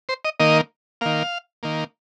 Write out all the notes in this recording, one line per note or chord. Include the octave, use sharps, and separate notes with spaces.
C5
D#5
D#3 A#3 D#5
D#3 A#3 F5
D#3 A#3